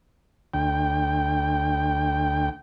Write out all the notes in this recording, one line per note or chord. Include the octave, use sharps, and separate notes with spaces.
D2 G5